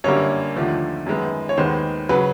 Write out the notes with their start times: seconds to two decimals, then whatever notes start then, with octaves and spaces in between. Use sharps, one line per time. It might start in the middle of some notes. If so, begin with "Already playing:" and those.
0.04 F#2 D3 G3 A#3 C#5
0.56 D#2 D3 F3 A3
1.07 F#2 D#3 G#3 B3
1.49 C#5
1.57 D#2 D#3 G#3 B3 C5
2.09 C#3 F#3 B4